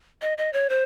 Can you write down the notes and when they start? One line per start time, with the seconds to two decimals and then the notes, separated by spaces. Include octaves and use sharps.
0.22 D#5
0.38 D#5
0.53 C#5
0.69 C5